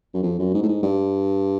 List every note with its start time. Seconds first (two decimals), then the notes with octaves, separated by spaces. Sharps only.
0.14 F#2
0.23 F2
0.39 F#2
0.54 G#2
0.63 A2
0.68 G#2
0.83 G2